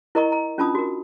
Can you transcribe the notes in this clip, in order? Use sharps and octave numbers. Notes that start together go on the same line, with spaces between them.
E4 A#4 D#5 A#5 C#6
A#5
C#4 D4 F4 A5 B5 D#6
F#4 A#4